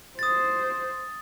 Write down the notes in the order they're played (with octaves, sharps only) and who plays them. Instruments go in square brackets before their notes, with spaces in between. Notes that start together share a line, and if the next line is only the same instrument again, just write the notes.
[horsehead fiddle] C5 [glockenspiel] D#6 A6